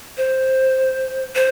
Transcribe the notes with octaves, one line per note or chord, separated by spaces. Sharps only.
C5
C5